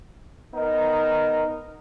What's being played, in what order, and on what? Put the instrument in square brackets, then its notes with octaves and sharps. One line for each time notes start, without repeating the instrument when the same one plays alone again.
[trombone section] B3 D#4 A#4